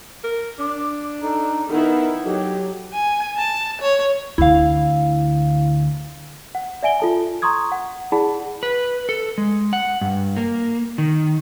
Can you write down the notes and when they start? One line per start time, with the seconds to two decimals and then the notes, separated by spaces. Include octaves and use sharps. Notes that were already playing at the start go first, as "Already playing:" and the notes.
0.24 A#4
0.59 D4 D6
1.22 D#4 A4
1.68 D#3 B3 D#4 E4
2.25 F#3 G4 A4
2.93 G#5
3.37 A5
3.81 C#5
4.38 D2 D3 E4 F5
6.55 F#5
6.83 D5 E5 G#5 D7 G7
7.00 F4 A4 A5
7.42 A#5 C6 C#6 D#6 G#6
7.72 F#5
8.12 E4 G#4 D5 F#5 A5 B5
8.63 B4
9.09 A4
9.38 G#3
9.73 F#5
10.01 G2
10.37 A#3
10.98 D#3